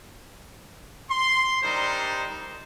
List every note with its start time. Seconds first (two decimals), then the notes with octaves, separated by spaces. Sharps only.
1.09 C6
1.62 G3 D4 D#4 A#4 C5